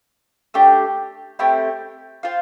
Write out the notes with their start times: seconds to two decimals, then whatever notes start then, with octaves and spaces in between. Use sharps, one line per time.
0.54 A3 D4 G4
1.39 A3 C4 E4 G4
2.23 F4 C5 F5